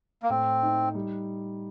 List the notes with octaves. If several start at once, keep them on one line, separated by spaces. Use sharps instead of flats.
A#3
A2 C4
D#4
G3